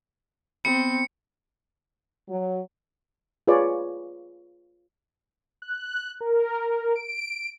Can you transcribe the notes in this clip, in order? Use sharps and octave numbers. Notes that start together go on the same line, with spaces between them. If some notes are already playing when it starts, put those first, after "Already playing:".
B3 C4 C#7
F#3
F4 G#4 B4 C#5 D5
F#6
A#4
D7